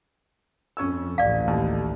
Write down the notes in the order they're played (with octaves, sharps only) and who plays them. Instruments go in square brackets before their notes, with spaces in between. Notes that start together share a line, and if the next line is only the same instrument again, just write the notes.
[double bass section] F2 [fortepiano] C#4 C#5 E6
[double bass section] A1 D2 A2 [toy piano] D5 F5
[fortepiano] D#2